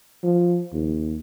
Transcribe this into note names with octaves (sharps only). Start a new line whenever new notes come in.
F3
D#2